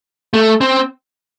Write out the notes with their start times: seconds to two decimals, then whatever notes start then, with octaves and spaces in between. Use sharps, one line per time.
0.34 A3
0.61 C4